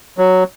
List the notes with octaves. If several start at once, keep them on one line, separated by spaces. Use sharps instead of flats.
F#3